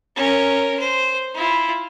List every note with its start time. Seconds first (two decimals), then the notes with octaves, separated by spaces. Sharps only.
0.16 C#4 A#4
0.79 C5
1.35 E4 F4